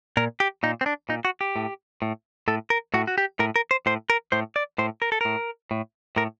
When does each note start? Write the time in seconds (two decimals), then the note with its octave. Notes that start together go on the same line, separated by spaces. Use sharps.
0.17 A#2 A#4
0.40 G4
0.63 A#2 D#4
0.81 C4
0.86 D4
1.09 A#2 D#4
1.25 F#4
1.41 G4
1.56 A2
2.02 A2
2.48 A2 A4
2.70 A#4
2.94 A2 F#4
3.07 F#4
3.18 G4
3.39 A2 A#4
3.56 A#4
3.71 C5
3.86 A2 C5
4.10 A#4
4.32 A2 C5
4.56 D5
4.78 A2 C5
5.02 A#4
5.12 A4
5.21 A2 A#4
5.71 A2
6.16 A2 A#4